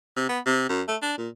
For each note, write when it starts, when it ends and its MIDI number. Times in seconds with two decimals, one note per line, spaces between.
0.16 0.29 48
0.29 0.39 59
0.46 0.66 48
0.69 0.82 42
0.88 0.97 57
1.02 1.14 62
1.18 1.29 46